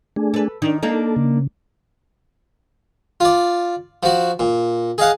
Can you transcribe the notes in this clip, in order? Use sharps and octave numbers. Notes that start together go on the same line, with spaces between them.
A3 D4 G#4
A4 B4
D#3 D4 D#4
A#3 D4 D#4 A4
C#3
F4 D5
F3 F#4
A#2
G#4 D#5 F5 F#5